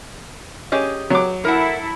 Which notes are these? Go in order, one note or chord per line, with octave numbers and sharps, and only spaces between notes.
C#4 G4 G#4 D#5
F#3 D6
E4 A4 A#4 F#5